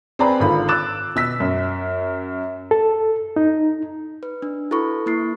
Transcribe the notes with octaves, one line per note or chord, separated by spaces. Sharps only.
C4 G#4 B4 D5 A#5 B5
G#1 D3 F4 B5
D6 E6 F#6 A6 E7
B2 E6 B6
F#2
A4
D#4
B4
D4
E4 F#4 A4 B4 B5 C#6
A#3 E4 C7